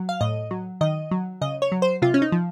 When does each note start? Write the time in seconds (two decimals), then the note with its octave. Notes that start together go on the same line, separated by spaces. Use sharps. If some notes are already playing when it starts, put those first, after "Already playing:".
Already playing: F#3
0.09 F5
0.21 A2 D#5
0.51 F#3
0.81 D#3 D#5
1.11 F#3
1.41 C#3 D#5
1.62 C#5
1.72 F#3
1.82 C5
2.02 C3 F4
2.14 C#4
2.22 D#4
2.32 F3